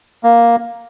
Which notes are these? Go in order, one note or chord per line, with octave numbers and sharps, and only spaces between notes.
A#3